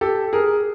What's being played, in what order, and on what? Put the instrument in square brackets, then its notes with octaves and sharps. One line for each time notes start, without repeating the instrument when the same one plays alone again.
[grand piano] G4 A4
G#4 A#4